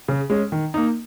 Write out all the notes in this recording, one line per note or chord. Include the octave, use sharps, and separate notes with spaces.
C#3
G#3 C#4
D#3
A#3 D#4